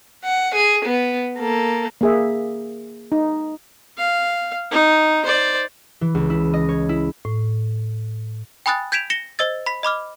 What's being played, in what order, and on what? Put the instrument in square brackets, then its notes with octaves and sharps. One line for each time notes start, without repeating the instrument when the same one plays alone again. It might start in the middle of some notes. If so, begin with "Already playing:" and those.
[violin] F#5
G#4
B3
A#3 A4
[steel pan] A#3 G#4 E5
D#4
[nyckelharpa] F5
D#4
C5 D5
[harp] E3
C#2
E4
D#5
C#5
E4
[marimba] A2
[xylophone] G5 G#5 B5 D#6 F#6 A6
G6 G#6 B6 D7 E7 F7
A#6 C#7 E7 G7
C5 D#5 E6 A6
B5 B6
D#5 B5 D6 F6